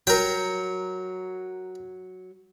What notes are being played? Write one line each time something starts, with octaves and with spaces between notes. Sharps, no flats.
F#3 A#4 G5